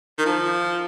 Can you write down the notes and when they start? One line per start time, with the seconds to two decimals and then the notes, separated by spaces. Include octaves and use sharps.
0.18 D#3
0.26 F3